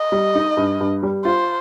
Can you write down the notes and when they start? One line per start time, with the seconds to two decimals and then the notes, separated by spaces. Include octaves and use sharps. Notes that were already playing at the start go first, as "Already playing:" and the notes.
Already playing: D#5
0.12 G3
0.35 D#4
0.57 G2
0.81 G2
1.03 G3
1.25 F4 C5